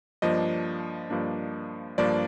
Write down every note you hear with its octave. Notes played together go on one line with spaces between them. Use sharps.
G2 F3 A#3 D4 D#5
G2 F3 A#3 D4
G2 F3 A#3 D4 D5